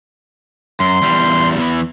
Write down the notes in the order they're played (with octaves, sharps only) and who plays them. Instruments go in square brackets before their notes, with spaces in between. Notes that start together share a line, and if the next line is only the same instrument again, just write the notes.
[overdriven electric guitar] F#2 [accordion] C6
[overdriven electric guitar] E2 G3
E2 E3